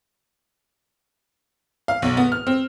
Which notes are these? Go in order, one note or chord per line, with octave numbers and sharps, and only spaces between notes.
F5
B1
B3
F6
C4